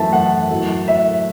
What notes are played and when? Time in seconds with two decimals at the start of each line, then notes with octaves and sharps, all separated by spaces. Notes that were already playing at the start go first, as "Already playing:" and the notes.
Already playing: F#2 E3 A3 E5 A5
0.13 F#5
0.51 A2 F#3 A3
0.88 E5